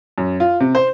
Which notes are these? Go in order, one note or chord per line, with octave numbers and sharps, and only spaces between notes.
F#2
F4
C3
C5